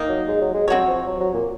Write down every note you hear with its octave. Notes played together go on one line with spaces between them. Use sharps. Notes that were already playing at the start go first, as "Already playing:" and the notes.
Already playing: D#3 A#3 D#4
F#3
G#3
F#3
G#3
F#3 C4 F#4 C#5
F3
F#3
F#3
A#2